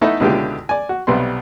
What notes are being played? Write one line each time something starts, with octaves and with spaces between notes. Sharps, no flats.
A3 B3 D#4 E4 A4 B4
C#2 B2 D3 E4 F4 G4
D5 G#5
F#4
B1 C3 G3 B3 C6